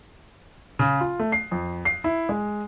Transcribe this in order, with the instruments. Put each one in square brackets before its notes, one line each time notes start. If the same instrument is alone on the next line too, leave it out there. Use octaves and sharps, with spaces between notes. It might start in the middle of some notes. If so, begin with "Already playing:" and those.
[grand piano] C#3
F4
A3
C7
F2
C7
E4
G#3